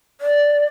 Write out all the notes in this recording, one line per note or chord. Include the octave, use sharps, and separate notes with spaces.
D5